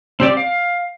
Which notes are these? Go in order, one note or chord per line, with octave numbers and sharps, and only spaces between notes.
C4 G4 D5 D6
F5